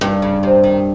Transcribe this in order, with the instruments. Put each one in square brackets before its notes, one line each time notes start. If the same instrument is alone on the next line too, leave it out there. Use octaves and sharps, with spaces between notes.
[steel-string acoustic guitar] G2 [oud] D#3
[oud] C#3
C3
D#3